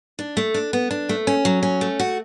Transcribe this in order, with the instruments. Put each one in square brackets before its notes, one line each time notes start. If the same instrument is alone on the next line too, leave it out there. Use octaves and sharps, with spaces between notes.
[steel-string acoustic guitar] D4
A3
D4
B3
D4
A3
C#4
F#3
C#4
A3
F#4